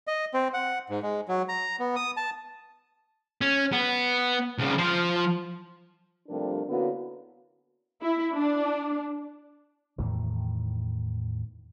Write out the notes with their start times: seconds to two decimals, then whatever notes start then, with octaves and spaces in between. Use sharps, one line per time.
0.07 D#5
0.34 C4
0.54 F#5
0.90 G#2
1.02 G#3
1.28 F#3
1.49 A#5
1.80 B3
1.96 D#6
2.17 A5
3.41 C#4
3.73 B3
4.58 C2 C#3
4.78 F3 C5
6.29 C3 F3 G3 A3 D4 A#4
6.68 D3 A#3 B3 C#4 E4 F#4
8.02 E4
8.35 D4
9.98 E2 A2 D#3 E3